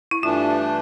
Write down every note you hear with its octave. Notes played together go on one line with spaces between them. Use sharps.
E4
G2 E3 A3 D4 F4